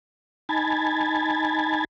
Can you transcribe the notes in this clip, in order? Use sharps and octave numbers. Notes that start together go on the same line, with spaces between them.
D#4 G#5 A5 B5 G#6 A6